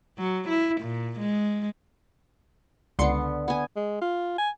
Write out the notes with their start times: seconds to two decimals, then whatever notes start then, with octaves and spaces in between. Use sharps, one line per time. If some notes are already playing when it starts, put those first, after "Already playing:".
0.18 F#3
0.49 E4
0.82 A#2
1.19 G#3
2.99 C#2 D3 B3 C6 C#7
3.48 B3 G#5
3.76 G#3
4.02 F4
4.38 G#5